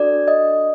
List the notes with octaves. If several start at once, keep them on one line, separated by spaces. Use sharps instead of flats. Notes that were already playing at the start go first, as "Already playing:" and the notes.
Already playing: D4 F#4 A4 D5
D#5